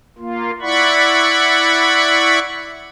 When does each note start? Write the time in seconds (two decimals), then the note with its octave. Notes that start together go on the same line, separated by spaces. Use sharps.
0.18 A#3 F4
0.61 E4 D5 F#5 B5 C#6